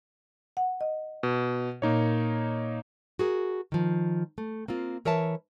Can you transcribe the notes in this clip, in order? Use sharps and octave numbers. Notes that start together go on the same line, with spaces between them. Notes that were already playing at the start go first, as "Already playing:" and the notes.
F#5
D#5
B2
A#2 A#3 D#4 C#5
F#4 G#4 A#4
D#3 F3
A3
A#3 C4 F4
E3 A#4 C#5 E5 A5